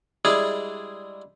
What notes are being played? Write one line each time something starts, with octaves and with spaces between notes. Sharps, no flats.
G3 G#3 D4 E4 G#4